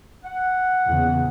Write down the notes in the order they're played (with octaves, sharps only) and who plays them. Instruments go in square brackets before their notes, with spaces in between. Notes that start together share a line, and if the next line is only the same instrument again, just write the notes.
[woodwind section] F#5
[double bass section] E2 A#2 C#3